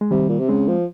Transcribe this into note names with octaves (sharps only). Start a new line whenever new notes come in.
G#3
C3 D#3 G3
A#2
C3
C#3 G#3 C4
F3